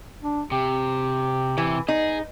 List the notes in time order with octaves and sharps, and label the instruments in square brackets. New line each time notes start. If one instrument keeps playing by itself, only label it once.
[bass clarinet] D4
[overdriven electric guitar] C3 [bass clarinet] G4
[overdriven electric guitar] C3 [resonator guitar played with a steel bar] E3
[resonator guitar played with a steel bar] D#4 [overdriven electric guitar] G#4